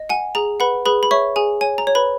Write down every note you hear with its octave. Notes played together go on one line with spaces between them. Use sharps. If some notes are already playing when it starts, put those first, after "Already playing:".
Already playing: D#5
F#5 G#5
G#4 A#5
B4 F#5 B5
G#4 B4 B5
B5
C#5 E5 C#6
G#4 G#5
C#5 G#5
A#5
C#5
B4 B5